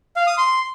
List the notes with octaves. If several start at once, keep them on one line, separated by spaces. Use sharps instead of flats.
F5
D#6
C6